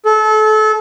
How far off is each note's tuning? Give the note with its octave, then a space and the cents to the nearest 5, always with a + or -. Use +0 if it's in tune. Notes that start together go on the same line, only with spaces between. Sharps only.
A4 -30